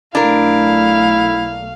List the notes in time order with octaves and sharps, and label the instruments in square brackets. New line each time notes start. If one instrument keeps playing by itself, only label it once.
[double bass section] B1 A3 [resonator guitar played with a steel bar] D4 A#4 [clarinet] E4 [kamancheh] F5